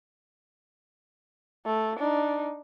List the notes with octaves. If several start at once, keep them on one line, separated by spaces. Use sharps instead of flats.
A3
D4 D#4